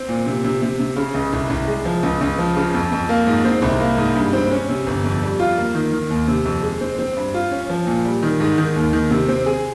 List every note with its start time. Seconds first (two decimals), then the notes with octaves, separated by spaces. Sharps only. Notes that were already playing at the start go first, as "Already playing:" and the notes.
Already playing: C4
0.09 A#2
0.26 C3
0.44 C3
0.62 C3
0.80 C3
0.96 C#3
1.14 C#2
1.33 C2
1.50 C2
1.68 G#3
1.85 F3
2.03 C#2
2.21 C#2
2.38 F3
2.56 C#3
2.74 F2
2.92 F2
3.09 A#3
3.27 G#2
3.45 C4
3.62 C2
3.80 A#3
3.98 G#2
4.16 G2
4.33 C4
4.51 C#4
4.69 C3
4.86 G1
5.04 F2
5.22 G3
5.40 F4
5.57 A#3
5.75 D#3
5.93 D#3
6.10 D#2
6.28 C3
6.45 F2
6.63 G#3
6.81 C4
6.99 C4
7.17 G2
7.34 F4
7.51 C#4
7.69 F3
7.87 A#2
8.04 G3
8.23 D#3
8.40 G#2
8.58 D#3
8.76 D#2
8.93 D#3
9.11 C3
9.29 C4
9.46 G#4